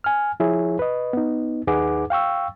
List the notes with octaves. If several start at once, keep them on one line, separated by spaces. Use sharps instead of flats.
G#5 F6
F3 E4 G#4 C#5
B4 D#5
B3 D#4
D#2 D#4 G#4 B4 F#5 D6
F5 G5 C#6 E6